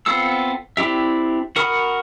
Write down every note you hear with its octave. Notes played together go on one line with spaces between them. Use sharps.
B3 C4 F4 A4 E6
C4 D4 E4 G4 E5
F#4 A#4 F#5 B5 D#6